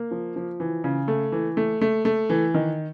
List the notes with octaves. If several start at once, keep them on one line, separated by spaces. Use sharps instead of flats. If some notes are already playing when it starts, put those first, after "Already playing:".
Already playing: A#3
F3
F3
E3
C#3
A3
E3
A3
A3
A3
E3
D#3